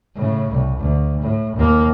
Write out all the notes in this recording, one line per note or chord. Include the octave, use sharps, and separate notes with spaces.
A2 C#3
C2
D2
A2
D#2 A#3